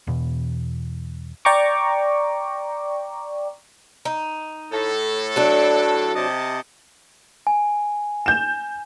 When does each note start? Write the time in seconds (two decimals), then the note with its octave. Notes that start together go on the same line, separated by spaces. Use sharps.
0.07 E2 B2 E3
1.45 D5 G5 A#5 C#6 D6
4.05 D#4
4.72 A2 A4
5.36 F#3 D4
6.16 C3 D#5 A5
7.47 G#5
8.26 G6 E7